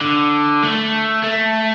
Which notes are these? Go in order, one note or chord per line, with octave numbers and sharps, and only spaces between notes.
D3
A3
A3